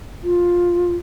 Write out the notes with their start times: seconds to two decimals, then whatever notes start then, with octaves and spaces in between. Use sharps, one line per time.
0.23 F4